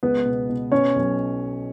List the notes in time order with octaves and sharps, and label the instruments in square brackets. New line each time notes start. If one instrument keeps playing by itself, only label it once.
[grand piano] C#2 B3 B4
B2
B2
B2 C#4 C#5
B1